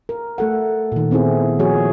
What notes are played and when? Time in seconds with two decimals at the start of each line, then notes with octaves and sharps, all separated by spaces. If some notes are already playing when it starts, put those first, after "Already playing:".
0.09 A#4
0.38 A3 A4 F#5
0.92 A#2 D#3
1.11 B3 C4 E4 G#4
1.59 F3 A#3 F#4 G#4 C#5